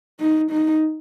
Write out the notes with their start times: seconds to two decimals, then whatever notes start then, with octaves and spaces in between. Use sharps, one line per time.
0.20 D#4
0.51 D#4